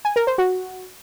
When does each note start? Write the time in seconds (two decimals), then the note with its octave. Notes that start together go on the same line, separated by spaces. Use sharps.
0.05 G#5
0.16 A#4
0.27 C5
0.38 F#4